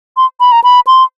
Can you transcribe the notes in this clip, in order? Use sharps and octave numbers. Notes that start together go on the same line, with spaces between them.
C6
B5
A#5
B5
C6